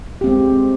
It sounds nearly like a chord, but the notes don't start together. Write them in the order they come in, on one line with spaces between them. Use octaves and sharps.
G4 C4 G#3